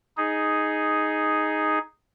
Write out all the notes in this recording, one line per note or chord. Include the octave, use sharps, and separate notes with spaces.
D#4 G#4